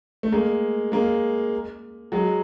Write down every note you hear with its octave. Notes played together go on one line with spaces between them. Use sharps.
A3
G#3 A#3
G#3 A#3
F#3 G#3